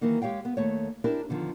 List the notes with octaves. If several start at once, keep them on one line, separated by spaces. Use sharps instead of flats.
D#3 E3 F#3 A#3 D#4
G#3 G4 C#5 F5 G5
B3
D#2 A3 C#5
D4 E4 G4 A#4
E2 D3 D#3 F3